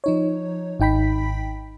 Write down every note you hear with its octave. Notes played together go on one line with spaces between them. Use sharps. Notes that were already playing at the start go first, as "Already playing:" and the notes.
F3 D#4 C#5
G#1 D#4 G5 B5 B6